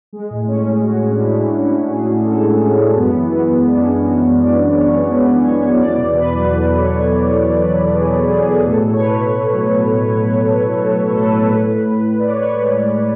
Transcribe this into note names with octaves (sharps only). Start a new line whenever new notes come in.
G#3
A2
A2 C#4
G#3
G#3 F#4
G#3
D4
G#3 E4
A2
G#3 E4
A2
A2 G#4
G#3
G#3 A4
A2
G#3 C#4
A2
F#2 B3
E3
G#3 B3
F#2
F#2 D4
C#4
E3 D4
F#2 F#4
E3
E3 D5
F#2
F#2 C#5
F#2
G#3 B4
E3
F#2 C#5
E3
E2 D5
B2
B2 B4
F#3
B2 A4
E2
C#5
E2 B4
F#3
E2 C#5
E2
E2 B4
E2
E2 G#4
B2
F#3 G#4
B2
A2 A4
A2
C#5
A2 B4
A2
A2
F#3
F#3
A2
F#3
F#3
A2
A2
A2 A4
A2
A2 A4
B4
A2
A2
A2
A2
A2
A2 D5
C#5
B4
A2 C#5
G#3
A2
A2